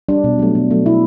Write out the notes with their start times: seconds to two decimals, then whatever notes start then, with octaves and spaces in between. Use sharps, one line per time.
0.08 G3 D4
0.24 B2
0.39 F#3 A3
0.55 B2
0.71 F#3 A3
0.85 B2 E4